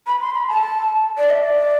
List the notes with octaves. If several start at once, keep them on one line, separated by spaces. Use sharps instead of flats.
B5
C6
B5
A5
D5
E5
D5